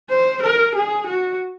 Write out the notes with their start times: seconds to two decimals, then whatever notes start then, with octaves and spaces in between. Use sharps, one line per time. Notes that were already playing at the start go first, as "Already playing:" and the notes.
0.09 C5
0.42 A#4
0.75 G#4
1.06 F#4